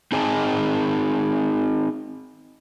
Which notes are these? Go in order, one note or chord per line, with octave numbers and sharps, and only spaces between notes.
C4 D#4 G#4 D#5 G#5 A5